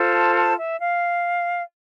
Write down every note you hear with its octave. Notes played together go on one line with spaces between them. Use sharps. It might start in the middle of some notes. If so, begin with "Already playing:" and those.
Already playing: F4 A4 C5
A5
A5
E5
F5